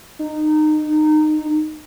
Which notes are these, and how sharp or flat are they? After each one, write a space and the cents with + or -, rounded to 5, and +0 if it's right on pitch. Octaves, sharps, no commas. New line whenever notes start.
D#4 -20